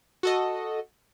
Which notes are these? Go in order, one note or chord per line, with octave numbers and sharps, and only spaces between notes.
F#4 A4 D#5